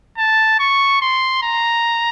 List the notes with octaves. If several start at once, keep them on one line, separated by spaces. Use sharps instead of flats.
A5
C#6
C6
A#5